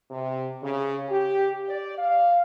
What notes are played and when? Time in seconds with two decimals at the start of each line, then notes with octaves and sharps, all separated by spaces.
0.10 C3
0.63 C#3
1.09 G4
1.69 D5
1.98 F5